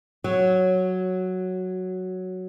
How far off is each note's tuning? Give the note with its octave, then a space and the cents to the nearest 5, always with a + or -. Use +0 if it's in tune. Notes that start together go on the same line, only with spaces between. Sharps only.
F#3 +0 C#5 -5